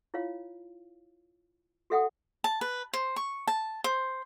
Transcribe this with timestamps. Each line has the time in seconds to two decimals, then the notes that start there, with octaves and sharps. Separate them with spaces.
0.14 E4 F4 C#5 F5
1.90 F#4 A4 E5 F#5 G5 D#6
2.44 A5
2.61 B4
2.93 C5
3.16 C#6
3.47 A5
3.84 C5